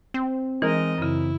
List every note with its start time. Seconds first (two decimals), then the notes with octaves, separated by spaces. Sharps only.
0.14 C4
0.62 E3 G#3 D#4 A#4 D#5
0.98 F#2 C#3 E4